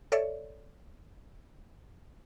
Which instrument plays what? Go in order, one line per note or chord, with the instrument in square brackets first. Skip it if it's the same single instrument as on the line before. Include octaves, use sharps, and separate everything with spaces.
[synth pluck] A4 C#5 D5 E5